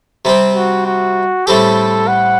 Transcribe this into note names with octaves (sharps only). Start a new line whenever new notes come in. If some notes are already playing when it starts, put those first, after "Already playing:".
C3 G3 C4
F#4
F#4
A2 G3 C4 G4 A4
F#5